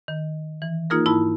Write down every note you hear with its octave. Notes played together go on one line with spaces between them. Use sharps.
D#3
E3
A#3 D#4 F4 G#4 A#4
G#2 E4 A5 B5